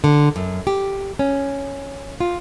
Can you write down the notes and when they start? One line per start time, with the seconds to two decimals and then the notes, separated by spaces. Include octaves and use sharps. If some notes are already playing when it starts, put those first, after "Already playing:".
0.04 D3
0.36 F#2
0.67 G4
1.19 C#4
2.21 F4